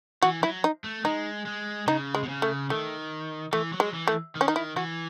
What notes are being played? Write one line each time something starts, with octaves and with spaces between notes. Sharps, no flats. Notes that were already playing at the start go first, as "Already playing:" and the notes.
E3 F#4
F#3 E4
D#4
A3
G#3 D#4
G#3
C#3 D#4
G#3
B2
C#3
A3
D#3 A3
E3 A3
F#3
G#3
E3
A3
D#3
C#4
D#4
E4
E3 F#4